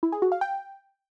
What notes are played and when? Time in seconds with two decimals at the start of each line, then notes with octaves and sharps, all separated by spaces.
0.03 E4
0.12 G#4
0.22 F#4
0.32 F5
0.41 G5